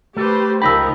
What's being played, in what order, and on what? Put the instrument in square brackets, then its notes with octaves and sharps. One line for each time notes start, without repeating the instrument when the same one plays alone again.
[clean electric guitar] A3 [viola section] G4 B4 C5
[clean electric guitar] C#2 D#4 B5 [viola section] F3 A#4 D#5 [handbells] G5 E6